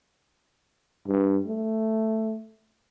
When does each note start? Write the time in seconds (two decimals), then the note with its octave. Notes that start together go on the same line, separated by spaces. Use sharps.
1.08 G2
1.47 A3